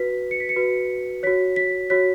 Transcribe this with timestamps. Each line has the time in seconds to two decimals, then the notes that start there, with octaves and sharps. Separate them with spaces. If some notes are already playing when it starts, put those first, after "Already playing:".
Already playing: F#4 B4 B6
0.31 C#7
0.40 B6
0.49 C#7
0.56 F#4 B4
1.23 F#4 C#5 B6
1.56 B6
1.90 F#4 C#5 B6